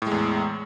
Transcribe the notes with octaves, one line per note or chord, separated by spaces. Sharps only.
E2 A2 G#3